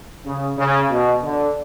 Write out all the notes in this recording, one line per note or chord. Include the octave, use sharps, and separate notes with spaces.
C#3
C#3
B2
D3